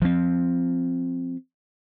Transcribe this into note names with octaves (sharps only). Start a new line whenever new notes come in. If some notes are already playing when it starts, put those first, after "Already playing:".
F3 C4